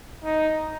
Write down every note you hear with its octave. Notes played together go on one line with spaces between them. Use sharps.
D#4